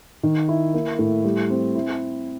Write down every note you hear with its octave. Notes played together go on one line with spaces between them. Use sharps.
D#3
E4
A#3
A2
G3
C4
E4